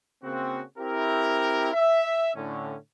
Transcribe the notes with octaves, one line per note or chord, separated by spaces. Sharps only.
C#3 A#3 C4 F#4
C4 E4 G4 A#4
E5
A2 D3 C#4